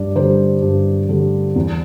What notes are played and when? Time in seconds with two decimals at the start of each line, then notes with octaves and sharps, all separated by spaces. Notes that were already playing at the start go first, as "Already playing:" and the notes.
Already playing: G2 D5
0.16 D3 G3 C5
0.62 G2
1.09 D3 G3
1.56 E2